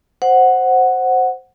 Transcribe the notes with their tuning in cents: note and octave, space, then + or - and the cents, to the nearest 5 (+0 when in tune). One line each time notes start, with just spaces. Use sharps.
C5 +0 F#5 +0